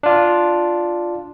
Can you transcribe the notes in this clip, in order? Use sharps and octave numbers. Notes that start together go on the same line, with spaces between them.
D4 F4